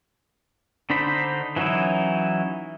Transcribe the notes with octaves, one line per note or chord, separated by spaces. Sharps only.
D3 D4 D#4 C5 B5
E3 F#3 C#4 D#4 E4